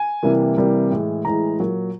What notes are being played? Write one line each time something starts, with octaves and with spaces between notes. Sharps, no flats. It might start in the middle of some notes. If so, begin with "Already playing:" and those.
Already playing: G#5
C3 E3 G3 A#3
C3 E3 G3 A#3
A2 E3 G#3
A2 E3 G#3 A#5
A#2 F#3 A#3